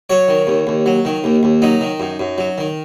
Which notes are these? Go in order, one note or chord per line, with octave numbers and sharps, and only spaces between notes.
F#3 C#5
D#3
D#2
D#2
F#3
D#3
D#2
D#2
F#3 D#4
D#3
F#2
F#2
F#3
D#3